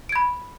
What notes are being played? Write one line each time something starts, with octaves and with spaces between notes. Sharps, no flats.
B5 G#6 D7